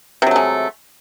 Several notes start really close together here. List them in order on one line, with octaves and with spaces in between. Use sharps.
C3 F#3 A3 G#3